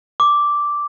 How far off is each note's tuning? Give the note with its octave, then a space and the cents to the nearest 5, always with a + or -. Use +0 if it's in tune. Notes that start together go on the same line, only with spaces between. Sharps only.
D6 -5